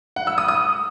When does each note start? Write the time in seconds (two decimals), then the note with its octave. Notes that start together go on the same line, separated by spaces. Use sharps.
0.16 F#5
0.27 E6
0.38 D#6
0.48 D#6